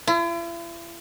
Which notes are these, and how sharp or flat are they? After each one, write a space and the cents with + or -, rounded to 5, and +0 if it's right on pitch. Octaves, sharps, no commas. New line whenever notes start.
E4 +45